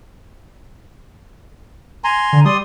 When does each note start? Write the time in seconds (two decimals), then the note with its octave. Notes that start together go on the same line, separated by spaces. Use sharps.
2.04 G#5 A#5 C6
2.33 D3
2.45 G3 D5 C6 D#6